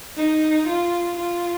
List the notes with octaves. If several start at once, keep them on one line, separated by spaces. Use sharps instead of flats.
D#4
F4
F4